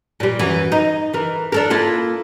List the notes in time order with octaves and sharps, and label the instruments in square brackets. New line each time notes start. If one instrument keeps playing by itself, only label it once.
[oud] A#2 G3
F#2 E3
D#4
E3 A#4
D4 A4 A#4
A#3 E4 F4